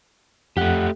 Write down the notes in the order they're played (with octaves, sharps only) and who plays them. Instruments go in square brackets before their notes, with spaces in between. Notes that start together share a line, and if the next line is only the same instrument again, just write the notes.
[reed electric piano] F2 F#5 F#6 [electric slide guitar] A3 G4